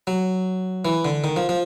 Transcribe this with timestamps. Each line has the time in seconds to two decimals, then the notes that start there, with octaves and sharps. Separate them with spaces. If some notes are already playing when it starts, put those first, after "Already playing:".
0.07 F#3
0.85 E3
1.05 D3
1.24 D#3
1.36 F3
1.49 F3